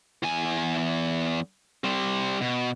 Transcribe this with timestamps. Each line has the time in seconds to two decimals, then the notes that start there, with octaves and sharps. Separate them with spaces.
0.23 E2 G#5
1.84 G3 C4
2.41 B2